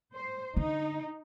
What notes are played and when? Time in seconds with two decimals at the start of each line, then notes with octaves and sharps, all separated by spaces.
0.14 C5
0.57 D3 D#4